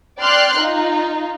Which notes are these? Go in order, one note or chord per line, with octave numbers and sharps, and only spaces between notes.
D5 G5 C6 F6 F#6
D#4 F4